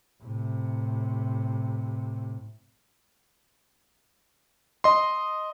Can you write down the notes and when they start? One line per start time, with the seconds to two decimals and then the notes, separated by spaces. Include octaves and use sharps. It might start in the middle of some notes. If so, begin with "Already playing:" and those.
0.22 A2 C3
4.84 D#5 C6